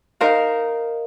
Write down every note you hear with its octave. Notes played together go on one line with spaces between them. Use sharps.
D#4 A#4 C5 F5